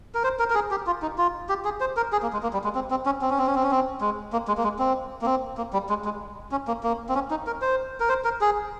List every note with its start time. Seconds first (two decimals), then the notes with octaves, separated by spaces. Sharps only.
0.15 A#4
0.24 C5
0.39 A#4
0.50 A#4
0.55 G#4
0.71 G4
0.87 F4
1.02 D#4
1.18 F4
1.49 G4
1.65 G#4
1.80 C5
1.97 A#4
2.12 G#4
2.22 A#3
2.33 G#3
2.43 A#3
2.53 G3
2.64 G#3
2.75 C4
2.91 C4
3.06 C#4
3.22 C4
3.30 C#4
3.38 C4
3.47 C#4
3.55 C4
3.63 C#4
3.71 C4
4.01 G#3
4.33 A#3
4.48 G#3
4.58 A#3
4.64 G#3
4.79 C4
5.21 A#3
5.26 C4
5.57 A#3
5.73 G3
5.89 G#3
6.05 G#3
6.51 C#4
6.68 A#3
6.83 A#3
7.09 C4
7.15 C#4
7.31 D#4
7.47 A#4
7.62 C5
8.00 A#4
8.09 C5
8.24 A#4
8.41 G#4